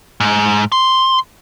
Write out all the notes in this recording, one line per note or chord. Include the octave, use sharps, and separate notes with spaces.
G#2
C6